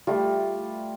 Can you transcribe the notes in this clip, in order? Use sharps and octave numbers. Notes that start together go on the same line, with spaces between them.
G3 A3 F4